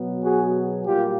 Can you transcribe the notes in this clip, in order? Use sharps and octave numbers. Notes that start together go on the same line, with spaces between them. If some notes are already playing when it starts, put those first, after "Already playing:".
Already playing: B2 F#3 B3
F#4 G#4
A#2 G3 A#3 F4 G4